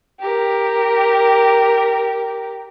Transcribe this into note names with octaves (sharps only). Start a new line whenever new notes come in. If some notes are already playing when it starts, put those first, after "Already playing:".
G4 A#4